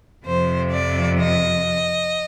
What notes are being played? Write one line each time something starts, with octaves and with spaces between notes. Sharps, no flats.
F2 C3 F3 C5
D5
D#5